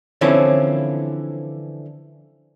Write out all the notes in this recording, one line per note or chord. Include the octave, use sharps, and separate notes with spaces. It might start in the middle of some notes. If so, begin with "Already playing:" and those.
D3 E3 F3 C4 C#4 E4